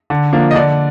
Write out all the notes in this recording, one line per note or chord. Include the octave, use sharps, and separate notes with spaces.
D3
F3 A#3 D4
D#5
D3 D5